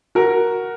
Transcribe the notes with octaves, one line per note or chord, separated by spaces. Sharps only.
F#4 A#4